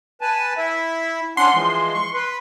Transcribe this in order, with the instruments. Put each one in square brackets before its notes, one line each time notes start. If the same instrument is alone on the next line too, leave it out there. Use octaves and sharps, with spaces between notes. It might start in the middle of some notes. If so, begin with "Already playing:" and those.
[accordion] B4 G#5 A5
E4 E5
[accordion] C#4 D4 F#5 [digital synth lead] C6
[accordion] E3 F3 G#3
C#6
B4